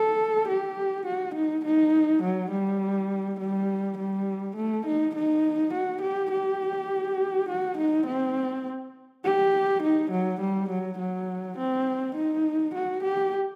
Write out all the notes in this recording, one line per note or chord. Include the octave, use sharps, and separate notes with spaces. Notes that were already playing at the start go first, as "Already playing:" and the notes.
Already playing: A4
G4
F#4
D#4
D#4
F#3
G3
G3
G3
A3
D#4
D#4
F#4
G4
G4
F#4
D#4
C4
G4
D#4
F#3
G3
F#3
F#3
C4
D#4
F#4
G4